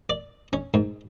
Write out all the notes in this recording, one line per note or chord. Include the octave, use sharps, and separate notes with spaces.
D5
C#4
G#2